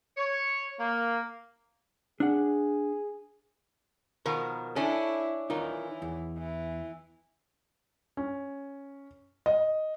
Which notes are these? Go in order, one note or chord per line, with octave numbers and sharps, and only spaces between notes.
C#5
A#3
D4 G#4 F#5
B2 D#3 F3 A#4
C#4 D4 E4 A4
E3 D#4 F4 A#4
E2
E3
C#4
D#5